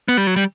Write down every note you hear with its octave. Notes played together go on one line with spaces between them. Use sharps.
B3
G3
F#3
G3